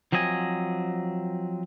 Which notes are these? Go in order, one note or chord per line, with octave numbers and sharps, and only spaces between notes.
F3 F#3 C4 D#5 G#5